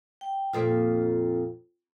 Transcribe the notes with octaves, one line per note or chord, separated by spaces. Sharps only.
G5
F2 A#2 A#3 F4 A4 C5